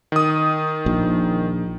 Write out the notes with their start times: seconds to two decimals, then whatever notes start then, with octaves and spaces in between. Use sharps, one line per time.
0.12 D#3 D#6
0.86 A#1